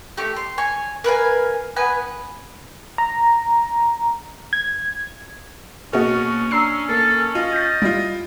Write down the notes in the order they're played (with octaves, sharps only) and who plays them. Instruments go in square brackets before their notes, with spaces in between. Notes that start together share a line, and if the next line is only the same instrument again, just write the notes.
[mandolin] A3 G4
C6
C#5 G#5
A#4 B4 F5 G#5
B3 B4 G#5
[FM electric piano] A#5
G#6
[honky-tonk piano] B2 F#4 D#5 [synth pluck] A#3 G#4 [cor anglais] C#4
[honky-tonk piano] D4 [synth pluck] A#5 E6 C7
[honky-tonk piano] A#3 [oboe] A4
[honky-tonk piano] F4 [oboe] D#5
[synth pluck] G6 A6
[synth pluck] G3 [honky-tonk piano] E4 F4